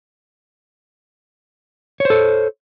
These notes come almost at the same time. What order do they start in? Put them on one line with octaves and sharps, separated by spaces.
C#5 C5 A4